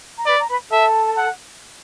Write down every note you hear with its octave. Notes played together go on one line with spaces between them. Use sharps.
A#5
B4 D5 B5
A#5
B4 B5
A4 E5 A5
F#5